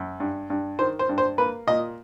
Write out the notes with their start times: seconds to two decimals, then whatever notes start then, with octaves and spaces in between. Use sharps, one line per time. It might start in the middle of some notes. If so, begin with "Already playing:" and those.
Already playing: F#2
0.20 G2
0.50 G2
0.79 D#3 C5
0.99 C5
1.09 G2
1.18 C5
1.38 A#3 B4
1.67 A#2 D#5